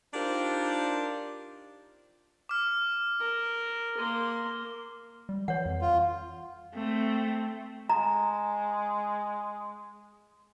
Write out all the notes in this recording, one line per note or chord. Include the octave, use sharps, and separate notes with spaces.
D4 D#4 F4 G4 A#4 C5
D6 F6
A#4
A#3 C6
G3
E3 C#5 F#5
F2
F4
A3 C4
G#3 A#5